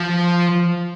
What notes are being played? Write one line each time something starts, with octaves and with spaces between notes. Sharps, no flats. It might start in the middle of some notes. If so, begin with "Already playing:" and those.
Already playing: F3